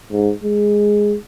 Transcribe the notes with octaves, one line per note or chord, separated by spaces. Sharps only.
G#2
G#3